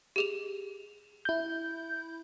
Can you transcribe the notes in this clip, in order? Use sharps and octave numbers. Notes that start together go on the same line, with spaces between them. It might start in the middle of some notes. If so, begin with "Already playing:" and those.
G4 G#4 F7
E4 G6